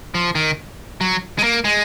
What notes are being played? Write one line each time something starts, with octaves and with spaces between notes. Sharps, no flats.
F3
D#3
F#3
G#3
A#3
G#3